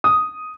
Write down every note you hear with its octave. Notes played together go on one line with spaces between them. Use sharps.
D#6